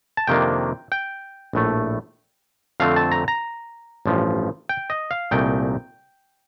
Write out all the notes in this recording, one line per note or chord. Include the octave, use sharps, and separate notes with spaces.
A5
F2 C3 D#3 A#3 D4 G5
G5
A#1 A2 A3
F2 D3 A3 C4 F5
A5
A#5
A#5
A1 G2 F3
G5
D#5
F5
C2 A#2 A3 D#4 G5